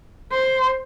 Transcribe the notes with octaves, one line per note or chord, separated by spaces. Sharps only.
C5